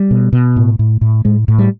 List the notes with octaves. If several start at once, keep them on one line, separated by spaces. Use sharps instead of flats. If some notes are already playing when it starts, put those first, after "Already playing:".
Already playing: G3
B2
B2
A2
A2
A2
A2 G#3
A2
G3